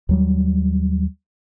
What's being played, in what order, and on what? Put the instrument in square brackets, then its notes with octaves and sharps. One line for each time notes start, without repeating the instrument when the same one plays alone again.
[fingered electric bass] D#2 F#3 G3